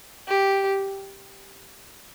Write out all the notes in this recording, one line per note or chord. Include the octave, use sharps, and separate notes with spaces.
G4